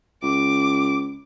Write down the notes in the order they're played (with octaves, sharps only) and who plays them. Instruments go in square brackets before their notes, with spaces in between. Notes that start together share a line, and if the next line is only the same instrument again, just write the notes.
[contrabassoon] C#2 [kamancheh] D6